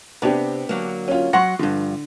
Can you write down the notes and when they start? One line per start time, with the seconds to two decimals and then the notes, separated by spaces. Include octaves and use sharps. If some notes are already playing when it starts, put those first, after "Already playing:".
0.22 C3 B3 D4 G4
0.69 D3 F#3 A#3
1.08 C#4 F4
1.33 F#3 F#5 C6 C#6 A#6
1.59 G2 D3 F3